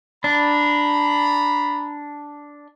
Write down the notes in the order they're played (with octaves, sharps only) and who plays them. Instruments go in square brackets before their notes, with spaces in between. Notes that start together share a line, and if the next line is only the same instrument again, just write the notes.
[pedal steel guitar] D4 [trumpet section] A#5 B5